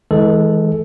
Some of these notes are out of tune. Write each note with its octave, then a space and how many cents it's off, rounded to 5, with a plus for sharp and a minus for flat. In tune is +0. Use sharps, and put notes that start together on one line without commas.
E3 -30 G#3 +15 A4 +0